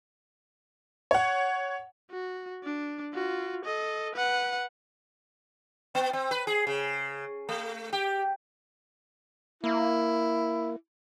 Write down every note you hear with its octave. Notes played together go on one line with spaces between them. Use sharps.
C#5 F#5
F#4
D4
F4 F#4
A4 D#5
B4 F#5
B3
C4
B4
G#4
C#3
A3
G4
A#3 E4